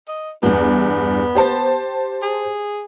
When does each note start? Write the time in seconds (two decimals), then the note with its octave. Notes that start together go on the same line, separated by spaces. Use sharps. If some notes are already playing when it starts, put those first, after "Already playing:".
0.08 D#5
0.43 E2 G2 B3
1.35 G4 C5 A5
2.22 G#4